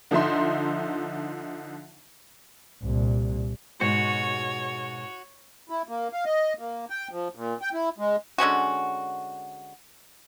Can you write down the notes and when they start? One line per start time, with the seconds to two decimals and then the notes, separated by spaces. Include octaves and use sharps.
0.11 D3 F3 D#4 E5 C6
2.83 C2 A#2
3.81 G#2 B2 F#4 C#5
5.70 E4
5.88 A#3
6.13 F5
6.25 D#5
6.59 A#3
6.90 G5
7.11 F3
7.35 A#2
7.62 G5
7.73 E4
7.98 G#3
8.38 D3 G#3 C#4 F#4